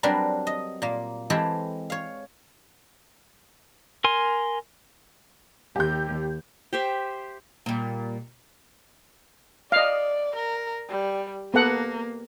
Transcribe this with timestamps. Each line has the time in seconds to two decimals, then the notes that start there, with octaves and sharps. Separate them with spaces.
0.03 F#3 G3 C4 D4 A#4 B4
0.47 D#5
0.82 A#2 A#3
1.30 E3 G#3 C4 E4 G4 A4
1.90 C#5 F5
4.04 A#4 G#5 C6
5.76 D#2 G4 G6
6.73 G4 C5 E5
7.66 A#2 G3
9.72 D5 D#5 F5
10.36 A#4
10.89 G3
11.54 A#3 B3 A4 F#5